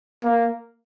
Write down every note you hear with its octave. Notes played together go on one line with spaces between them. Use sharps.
A#3